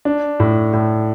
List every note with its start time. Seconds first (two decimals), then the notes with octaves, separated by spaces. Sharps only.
0.05 D4
0.40 A2
0.73 A2